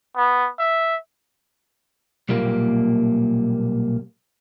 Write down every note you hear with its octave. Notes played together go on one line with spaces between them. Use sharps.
B3
E5
B1 A#2 G3 A#3